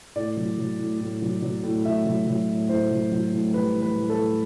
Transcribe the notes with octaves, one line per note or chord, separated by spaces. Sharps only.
A2 D5
F#3
F#3
A2
A2
F#3
F#3
A2
A2 E5
F#3
F#3
A2
A2 C5
F#3
F#3
A2
G3 B4
E3
B4
A2
A4
A2